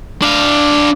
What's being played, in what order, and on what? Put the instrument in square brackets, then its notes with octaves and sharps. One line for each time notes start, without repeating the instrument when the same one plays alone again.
[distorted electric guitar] D4 F5